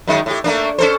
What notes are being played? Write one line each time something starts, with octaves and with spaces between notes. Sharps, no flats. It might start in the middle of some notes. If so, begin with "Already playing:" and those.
F#2 D#3 G#3
A2 G4
A3 A#3 D4
C#4 A4 C5